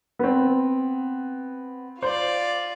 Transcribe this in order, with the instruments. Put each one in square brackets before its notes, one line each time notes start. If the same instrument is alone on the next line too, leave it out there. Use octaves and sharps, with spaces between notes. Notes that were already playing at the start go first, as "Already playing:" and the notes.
[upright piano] B3 C4
[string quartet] F4 D5 [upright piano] C5